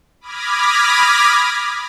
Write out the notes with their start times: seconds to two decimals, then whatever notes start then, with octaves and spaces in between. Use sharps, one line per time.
0.21 B5 D6 D#6 F6 G#6 A#6